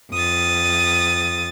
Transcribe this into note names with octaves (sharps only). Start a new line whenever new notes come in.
F2 D#6 A6